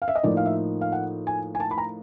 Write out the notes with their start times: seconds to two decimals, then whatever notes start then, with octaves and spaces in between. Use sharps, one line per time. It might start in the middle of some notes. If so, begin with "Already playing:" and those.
0.02 F5
0.08 E5
0.16 D#5
0.23 A2 F3 A#3 D#4 D5
0.37 F5
0.46 E5
0.81 F5
0.92 F#5
1.27 G#5
1.55 G#5
1.60 A5
1.71 B5
1.78 A#5